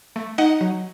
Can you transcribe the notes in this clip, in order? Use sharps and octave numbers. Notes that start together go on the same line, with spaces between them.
A3
D#4 D#5 F#5
F#3